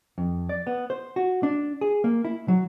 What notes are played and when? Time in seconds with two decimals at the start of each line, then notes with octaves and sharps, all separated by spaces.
0.18 F2
0.49 D5
0.67 B3
0.90 C5
1.16 F#4
1.43 D4
1.81 G#4
2.04 A#3
2.25 E4
2.48 F#3